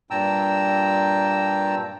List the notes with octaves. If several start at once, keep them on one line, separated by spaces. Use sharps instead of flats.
G2 A#2 G5 A5 A#5 E6